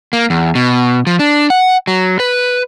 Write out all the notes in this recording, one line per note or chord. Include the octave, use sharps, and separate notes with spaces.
A#3
E2
B2
F3
D4
F#5
F#3
B4